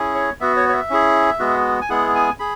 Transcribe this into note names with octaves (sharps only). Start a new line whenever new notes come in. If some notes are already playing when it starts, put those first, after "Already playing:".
Already playing: C#4 E4 G#4
C#5
B3 F#4 E5
C#5
C#5
E5
C#4 E4 G#4
G#3 B3 F#4
G#5
G#3 B3 E4 G#4 F#5
G#5
G#4 B5